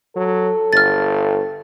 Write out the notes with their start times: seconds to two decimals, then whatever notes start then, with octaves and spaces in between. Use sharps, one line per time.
0.16 F#3 A4
0.73 G1 F6 A6